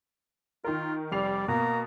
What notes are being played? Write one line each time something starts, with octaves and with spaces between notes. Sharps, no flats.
D#3 F4 A#4
F1 G3 D5 C7 F7
B2 A#3 A#5